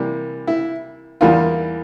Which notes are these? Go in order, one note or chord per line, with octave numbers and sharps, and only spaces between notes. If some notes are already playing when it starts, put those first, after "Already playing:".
Already playing: C3 E3 G3 A#3
E4
E2 E3 G3 A#3 F4